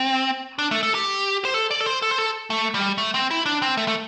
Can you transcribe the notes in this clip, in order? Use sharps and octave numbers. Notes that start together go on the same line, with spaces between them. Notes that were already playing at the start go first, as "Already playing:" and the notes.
Already playing: C4
D4
A3
A4
G4
C5
A4
D5
A4
C5
A4
C5
A4
A3
G3
A3
C4
E4
D4
C4
A3
A3